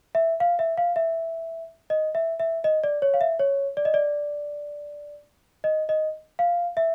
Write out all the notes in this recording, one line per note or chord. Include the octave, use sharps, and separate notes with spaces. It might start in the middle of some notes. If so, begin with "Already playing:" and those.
E5
F5
E5
F5
E5
D#5
E5
E5
D#5
D5
C#5
F5
E5
C#5
D5
D#5
D5
D#5
D#5
F5
E5